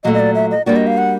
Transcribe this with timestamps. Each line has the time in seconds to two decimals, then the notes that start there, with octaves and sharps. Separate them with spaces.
0.04 A#2 F#3 A3 D#5
0.14 D#5
0.20 D5
0.35 E5
0.51 D#5
0.66 G3 A#3 D4 F#4 D5
0.76 D#5
0.87 F5
0.98 F#5